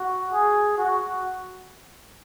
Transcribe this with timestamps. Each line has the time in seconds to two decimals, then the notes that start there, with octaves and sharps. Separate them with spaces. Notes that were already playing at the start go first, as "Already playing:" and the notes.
Already playing: F#4
0.33 G#4
0.78 F#4